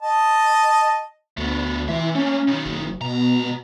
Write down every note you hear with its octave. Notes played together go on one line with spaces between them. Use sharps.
D#5 A5
D2 A3 B3
E3 C4 E5
A3 A#3 C#4
B1 D#3
F#1
C#2 B2 A#5